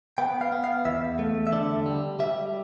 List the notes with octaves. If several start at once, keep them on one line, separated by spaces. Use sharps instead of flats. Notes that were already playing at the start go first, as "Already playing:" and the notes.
B3 G5
F5
B3
F5
E2 E5
A3
E5
D3 D5
G3
G3 E5